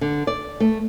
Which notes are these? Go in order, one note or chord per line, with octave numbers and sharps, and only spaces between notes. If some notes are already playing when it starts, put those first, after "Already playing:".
D3
D5
A3